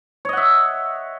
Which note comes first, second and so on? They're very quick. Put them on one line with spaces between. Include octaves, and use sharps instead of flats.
C#5 D#5 F#5 E5